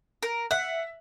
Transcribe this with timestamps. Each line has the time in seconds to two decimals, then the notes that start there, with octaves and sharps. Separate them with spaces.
0.23 A#4
0.51 E5 F#5